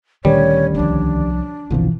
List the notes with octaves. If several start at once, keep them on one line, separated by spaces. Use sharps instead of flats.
D2 A#2 D#3 G3 C#4 C#5
C2 F3 D4
G1 C2 B2 E3 F3